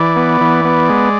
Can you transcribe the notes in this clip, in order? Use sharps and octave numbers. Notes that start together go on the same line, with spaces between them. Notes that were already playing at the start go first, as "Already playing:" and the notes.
Already playing: E3 D5
B3
E3
B3
G#3